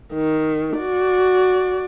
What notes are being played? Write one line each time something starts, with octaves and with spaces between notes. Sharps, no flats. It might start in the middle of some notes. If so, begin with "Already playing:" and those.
D#3
F#4 D5